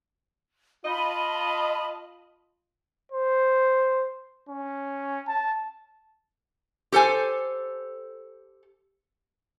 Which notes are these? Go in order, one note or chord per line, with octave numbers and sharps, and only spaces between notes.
F4 D#5 A5 B5
C5
C#4
A5
G4 A4 C5 G#5